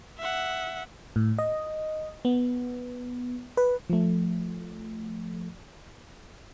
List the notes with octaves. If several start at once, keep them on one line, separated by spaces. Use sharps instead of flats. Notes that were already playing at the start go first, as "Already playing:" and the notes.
E5 F#5
A2
D#5
B3
B4
F3 A3